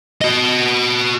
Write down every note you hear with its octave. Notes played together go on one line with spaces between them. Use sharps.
F#4 D#5